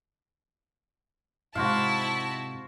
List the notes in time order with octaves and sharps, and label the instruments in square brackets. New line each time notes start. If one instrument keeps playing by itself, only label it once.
[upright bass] G#2 C3 [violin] E4 A5 [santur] F#4 C5 F5